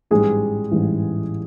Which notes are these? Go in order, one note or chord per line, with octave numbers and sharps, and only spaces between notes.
A1 G#2 E3 G3 G#3 G#4
A1 G#2 E3 G3